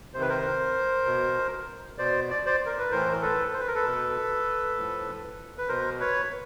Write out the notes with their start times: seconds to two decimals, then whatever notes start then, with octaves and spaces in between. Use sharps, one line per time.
0.14 C3 D#3 C5
0.22 B4
0.29 A#4 C5
1.06 B2
1.98 B2 C5 D5
2.30 D5
2.46 C5 D5
2.66 A#4
2.79 B4
2.91 A2 E3 A#4 C5
3.12 A#4
3.22 A4 B4
3.53 C5
3.60 B4
3.68 A#4
3.75 A4 B4
3.84 B2
4.77 A2 F3
5.58 B4
5.68 B2 A#4 C5
6.00 B4 C#5